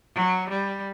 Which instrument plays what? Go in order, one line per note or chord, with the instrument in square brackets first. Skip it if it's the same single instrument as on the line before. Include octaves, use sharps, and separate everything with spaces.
[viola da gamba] F#3
G3